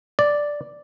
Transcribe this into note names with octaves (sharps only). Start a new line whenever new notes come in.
D5